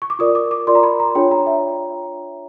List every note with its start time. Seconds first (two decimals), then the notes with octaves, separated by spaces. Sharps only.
0.02 C#6
0.10 D6
0.19 F4 A#4 D5 D#6
0.35 D6
0.51 D6
0.67 F4 A#4 D5 C6
0.75 A#5
0.83 B5
1.00 A#5
1.15 D4 F4 G#4 C#5 G5
1.31 A#5
1.47 E5